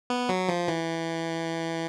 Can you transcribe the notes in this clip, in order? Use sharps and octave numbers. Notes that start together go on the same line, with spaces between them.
B3
F#3
F3
E3